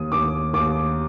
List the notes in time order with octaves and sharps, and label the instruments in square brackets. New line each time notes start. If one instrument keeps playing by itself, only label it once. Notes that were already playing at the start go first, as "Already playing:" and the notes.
Already playing: [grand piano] D#2 D#6
D#2 D6
D#2 D6